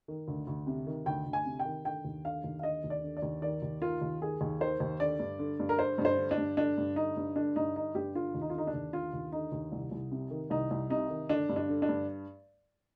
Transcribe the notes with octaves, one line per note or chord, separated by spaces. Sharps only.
D#3
D2
D2
C3
D#3
D2 G5
D2
G#5
C3
G5
D#3
D3 G5
D#2
D3 F5
D#2
F5
D3 D#5
D#2
D5
D3
D5
D#2
D#3 D5
D#2
D#3 F4
D#2
D#3 G#4
D#2
D#3 C5
D#2
D3 D5
G2
D3
G2
A#4
D3 C5
G2
C5
D3
D4
G2
D3 D4
G2
D3 D#4
G2
D3 D4
G2 D#4
D3 D#4
G2 G4
D3 F4
D#2
D#4
F4
D3 D#4
D4
D#2
D3 F4
D#2
D3 D#4
D#2
C2
C2
C3
D#3
C2 D#4
C2
C3 D#4
D#3
D3 D4
G2
D4
D3
D4
G2